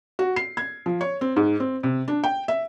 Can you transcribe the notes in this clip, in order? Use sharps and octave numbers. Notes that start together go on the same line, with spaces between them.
F#4
C7
G#6
F3
C#5
C4
G#2
C4
C3
D4
G5
E5